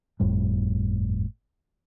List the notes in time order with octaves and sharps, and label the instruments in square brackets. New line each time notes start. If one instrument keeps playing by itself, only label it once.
[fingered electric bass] G1 F2 A2 G3